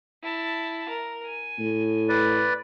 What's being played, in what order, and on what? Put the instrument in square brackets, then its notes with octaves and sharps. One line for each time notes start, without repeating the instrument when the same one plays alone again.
[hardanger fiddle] E4 A5
A#4
G#5
[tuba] A2
[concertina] B4 D5